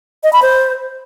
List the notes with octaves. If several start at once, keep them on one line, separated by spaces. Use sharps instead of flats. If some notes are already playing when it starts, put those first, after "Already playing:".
D#5
B5
C5